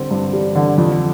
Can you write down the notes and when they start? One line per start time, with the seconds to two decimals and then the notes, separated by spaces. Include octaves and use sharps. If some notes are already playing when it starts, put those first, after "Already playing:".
Already playing: D3 G3 C4
0.11 G2
0.33 G3
0.55 D3
0.78 F2